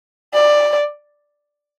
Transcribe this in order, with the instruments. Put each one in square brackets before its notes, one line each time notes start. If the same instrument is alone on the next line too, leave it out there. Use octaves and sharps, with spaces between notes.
[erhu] D5